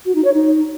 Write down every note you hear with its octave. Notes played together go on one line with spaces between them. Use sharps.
F#4
D#4
C#5
D#4